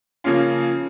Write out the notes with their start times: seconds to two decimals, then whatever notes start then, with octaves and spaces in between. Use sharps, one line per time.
0.24 C#3 F3 A#3 C#4 F4